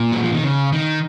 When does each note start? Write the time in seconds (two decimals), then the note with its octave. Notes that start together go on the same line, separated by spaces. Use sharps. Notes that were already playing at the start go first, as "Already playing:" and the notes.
Already playing: A#2
0.12 F#3
0.23 F3
0.32 D#3
0.43 C#3
0.72 D#3